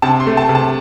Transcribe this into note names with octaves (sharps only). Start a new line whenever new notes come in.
C3 A5
C6
A3
A5
C3
A5